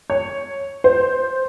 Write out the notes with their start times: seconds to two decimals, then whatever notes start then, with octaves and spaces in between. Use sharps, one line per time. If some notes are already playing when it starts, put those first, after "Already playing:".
0.10 C#5
0.84 C5